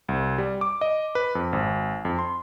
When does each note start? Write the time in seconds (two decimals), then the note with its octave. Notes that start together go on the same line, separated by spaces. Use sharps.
0.08 C2
0.38 G3
0.61 D6
0.81 D#5
1.15 B4
1.35 F2
1.53 G#1
2.05 F2
2.19 C6